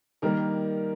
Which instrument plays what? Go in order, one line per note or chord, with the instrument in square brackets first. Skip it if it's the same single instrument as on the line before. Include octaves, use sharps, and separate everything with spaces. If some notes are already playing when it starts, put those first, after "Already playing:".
[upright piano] D#3 G3 A#3 A#4